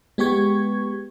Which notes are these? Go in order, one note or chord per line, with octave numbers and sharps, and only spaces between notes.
G#3 B3 G4 C#6 G#6